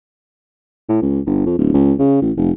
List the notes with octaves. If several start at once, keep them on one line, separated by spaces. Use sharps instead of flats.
A2
C#2
G1
F2
D1
C#2
C#3
A1
F1